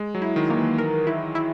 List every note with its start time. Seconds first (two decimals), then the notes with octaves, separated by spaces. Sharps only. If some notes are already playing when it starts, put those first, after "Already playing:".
Already playing: G#3
0.15 F#3
0.22 E4
0.36 D#3
0.49 D#3 A#3
0.57 E3
0.78 A#4
1.07 E4
1.35 E4